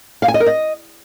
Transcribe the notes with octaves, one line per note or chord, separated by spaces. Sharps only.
F5
G#5
D#5
A#4
D#5